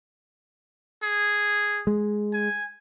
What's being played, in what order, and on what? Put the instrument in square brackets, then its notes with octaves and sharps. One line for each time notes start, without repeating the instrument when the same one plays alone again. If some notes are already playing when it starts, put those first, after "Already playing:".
[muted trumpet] G#4
[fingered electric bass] G#3
[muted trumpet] G#5